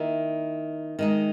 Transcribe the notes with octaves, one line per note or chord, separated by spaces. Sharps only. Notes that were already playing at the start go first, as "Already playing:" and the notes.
Already playing: D#3 A#3 E4
D#3 G#3 D#4